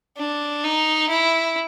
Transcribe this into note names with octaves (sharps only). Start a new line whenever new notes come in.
D4
D#4
E4